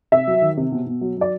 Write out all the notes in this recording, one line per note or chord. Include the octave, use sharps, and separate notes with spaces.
C3 E5
F#3
D#3
C3
B2
B2
F#3
F#3 D5